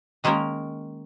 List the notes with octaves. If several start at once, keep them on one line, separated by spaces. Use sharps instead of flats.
D#3 G#3 A#3 C#4 A#4 C#5